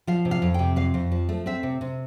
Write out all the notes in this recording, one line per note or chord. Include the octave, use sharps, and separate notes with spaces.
F3 F5
C3
F5
F2
C3 G5
F2 F5
F2
F3
A3
C4 E5
C3
C3